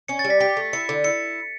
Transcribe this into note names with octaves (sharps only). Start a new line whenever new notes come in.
C#4 C#7
A6
G3
B6
G4 B6
A3
E4 C#7
D3
E4 C#7